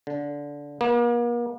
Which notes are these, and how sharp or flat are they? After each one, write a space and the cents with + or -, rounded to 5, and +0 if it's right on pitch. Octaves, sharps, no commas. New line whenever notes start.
D3 -20
A#3 +40